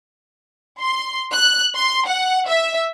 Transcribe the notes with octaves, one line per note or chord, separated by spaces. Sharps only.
C6
F#6
C6
F#5
E5